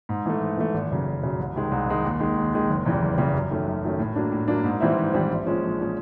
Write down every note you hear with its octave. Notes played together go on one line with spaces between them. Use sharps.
G#2
E3 A3
G#2
E3 A3
G#1
F#2 C#3 F#3
G#1
F#2 C#3 F#3
C2
C3 D#3 G#3
C2
C3 D#3 G#3
D#2
D#3 G#3
D#2
D#3 G#3
F#1
E2 C#3 E3 G3
F#1
E2 C#3 E3 G3
F#2
D#3 F#3 A3 C#4
F#2
D#3 F#3 A3 C#4
A2
F#3 A#3 D4
A2
F#3 A#3 D4
G#2
E3 G3 C4 E4
G#2
E3 G3 C4 E4
A#1
A#2 F3 G#3 C#4
A#1
A#2 F3 G#3 C#4